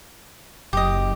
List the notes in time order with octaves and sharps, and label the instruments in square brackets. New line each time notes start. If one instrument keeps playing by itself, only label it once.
[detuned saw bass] F#1 [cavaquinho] G4 D#5